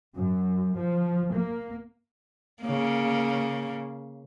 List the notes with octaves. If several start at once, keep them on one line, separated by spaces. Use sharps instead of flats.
F#2
F3
A#3
C#3 A#3